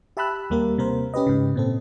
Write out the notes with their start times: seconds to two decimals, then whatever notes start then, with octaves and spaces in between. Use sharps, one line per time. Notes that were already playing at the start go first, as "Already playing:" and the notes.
0.17 G4 E5 A5 B5 E6 F#6
0.50 D#2 G3 A#3 G4 A#4
0.78 C3 A#3 A#4 C5
1.14 C#4 G4 B4 D#5
1.27 G#2 C#3
1.56 A#2 C4 A4